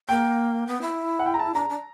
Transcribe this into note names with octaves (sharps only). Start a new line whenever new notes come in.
A#3 G5
B3
E4
F#5
G5
A#5
A5
D4 A#5
D4